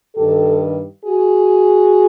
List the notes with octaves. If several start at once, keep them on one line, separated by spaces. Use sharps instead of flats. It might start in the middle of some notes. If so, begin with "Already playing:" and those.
G2 D#3 G4 A4
F#4 G#4